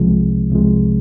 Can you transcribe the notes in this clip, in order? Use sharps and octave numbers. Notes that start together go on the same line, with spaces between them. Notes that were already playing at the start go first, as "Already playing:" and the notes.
Already playing: C2 C3 F3 G#3
C2 C3 F3 G#3